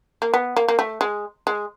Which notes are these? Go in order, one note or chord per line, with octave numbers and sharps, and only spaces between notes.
A#3
B3
A#3
A#3
A3
G#3
G#3